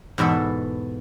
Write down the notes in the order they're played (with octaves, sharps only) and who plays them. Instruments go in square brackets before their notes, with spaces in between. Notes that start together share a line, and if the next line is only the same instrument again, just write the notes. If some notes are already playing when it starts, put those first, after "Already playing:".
[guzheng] E2 G#2 B2 A4